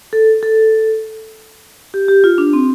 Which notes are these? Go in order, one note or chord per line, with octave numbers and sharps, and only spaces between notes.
A4
A4
G4
G4
F4
D4
C4